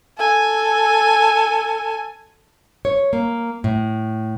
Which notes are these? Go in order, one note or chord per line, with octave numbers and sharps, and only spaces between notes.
A4 G#5
C#5
A#3
A2